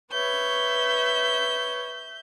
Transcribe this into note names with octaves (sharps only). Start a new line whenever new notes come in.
B4 C#5 E5 G6